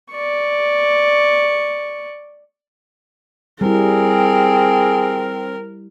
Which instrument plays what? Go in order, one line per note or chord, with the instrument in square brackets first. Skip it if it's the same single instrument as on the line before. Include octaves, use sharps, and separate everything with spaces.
[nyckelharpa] D5 C#6
[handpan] G3 E4 [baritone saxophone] C4 [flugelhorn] G#4 [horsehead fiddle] A#4